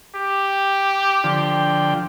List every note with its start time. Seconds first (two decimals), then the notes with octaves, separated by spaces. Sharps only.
0.16 G4
1.24 D3 F3 G5